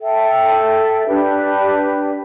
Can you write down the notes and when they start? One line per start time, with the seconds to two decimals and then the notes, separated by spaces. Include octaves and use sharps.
0.01 A4 E5 G5
1.06 D4 G4 B4